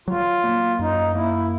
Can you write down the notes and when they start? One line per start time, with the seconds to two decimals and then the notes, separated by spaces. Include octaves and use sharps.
0.08 F#3 F4
0.44 A#3
0.79 F#2 D#4
1.15 A#3 E4